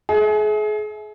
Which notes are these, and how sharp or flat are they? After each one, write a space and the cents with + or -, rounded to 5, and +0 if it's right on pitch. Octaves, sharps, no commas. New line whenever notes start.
G#4 +35 E5 -20